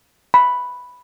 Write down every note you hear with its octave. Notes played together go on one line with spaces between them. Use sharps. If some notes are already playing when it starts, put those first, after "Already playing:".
B5